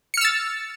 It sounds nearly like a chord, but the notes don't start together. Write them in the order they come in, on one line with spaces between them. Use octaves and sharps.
C#7 F6 E6 A6